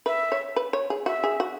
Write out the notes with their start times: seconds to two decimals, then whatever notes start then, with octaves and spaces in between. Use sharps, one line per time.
0.06 B4 E5
0.32 C#5
0.56 B4
0.73 C#5
0.90 G#4
1.06 F#4 E5
1.24 G#4
1.40 F#4